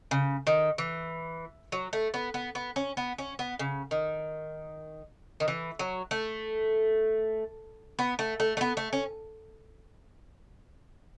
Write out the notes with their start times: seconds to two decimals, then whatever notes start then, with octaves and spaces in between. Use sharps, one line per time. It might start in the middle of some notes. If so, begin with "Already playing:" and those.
0.11 C#3
0.47 D#3
0.78 E3
1.72 F#3
1.93 A3
2.14 B3
2.34 B3
2.55 B3
2.76 C#4
2.97 B3
3.18 C#4
3.39 B3
3.59 C#3
3.91 D#3
5.40 D#3
5.48 E3
5.79 F#3
6.11 A3
7.99 B3
8.19 A3
8.40 A3
8.57 A3
8.61 B3
8.77 A3
8.93 C#4